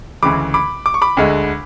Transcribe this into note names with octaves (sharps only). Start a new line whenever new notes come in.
D2 C#3 E3 G#3 B5 D6
B5 D6
D6
C#6
B5 D6
D2 D3 G#3